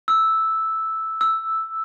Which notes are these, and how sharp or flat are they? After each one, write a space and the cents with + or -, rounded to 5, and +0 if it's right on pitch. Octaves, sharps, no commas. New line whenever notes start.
E6 -5
E6 +0